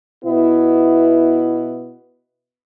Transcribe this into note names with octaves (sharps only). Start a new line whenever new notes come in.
B2 B3 E4